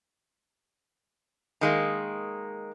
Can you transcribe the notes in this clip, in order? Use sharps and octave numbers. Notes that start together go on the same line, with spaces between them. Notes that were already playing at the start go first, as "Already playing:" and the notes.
D#3 G#3 A#3